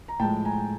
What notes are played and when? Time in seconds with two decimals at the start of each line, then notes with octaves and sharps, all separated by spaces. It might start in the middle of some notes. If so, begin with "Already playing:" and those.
0.08 A#5
0.20 A2 F3 G#3 G5 A5
0.45 G#5 A#5